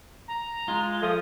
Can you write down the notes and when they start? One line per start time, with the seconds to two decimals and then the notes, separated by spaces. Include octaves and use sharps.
0.28 A#5
0.68 G#3 F4
1.02 F3 A3 D#6